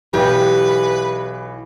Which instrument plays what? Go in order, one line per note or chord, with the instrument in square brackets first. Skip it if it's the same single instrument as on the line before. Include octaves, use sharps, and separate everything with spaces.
[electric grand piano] B1 E3 [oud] G4 [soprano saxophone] B4